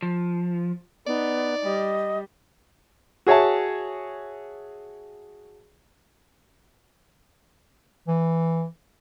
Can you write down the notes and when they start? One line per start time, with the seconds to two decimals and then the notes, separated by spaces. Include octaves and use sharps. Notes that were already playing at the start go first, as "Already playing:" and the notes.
0.02 F3
1.06 B3 D#4 D5
1.64 G3 D#5
3.27 F#4 G#4 C#5 E5 A5
8.08 E3